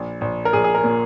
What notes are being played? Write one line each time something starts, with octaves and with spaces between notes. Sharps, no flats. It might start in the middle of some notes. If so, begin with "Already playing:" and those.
Already playing: A#1
A#1
A#4
A#1 G#4
G#4
A#4
A#2